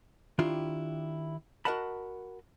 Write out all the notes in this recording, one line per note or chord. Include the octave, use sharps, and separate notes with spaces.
D#3 D4 E4 F4 G4
F#4 A#4 D#5 F#5 A5 B5